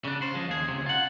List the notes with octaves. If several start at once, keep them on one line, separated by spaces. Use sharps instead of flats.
C#3 D4
C#3 C5
F3 G#3
D#2 G#4
C#2 C3
F4 F#5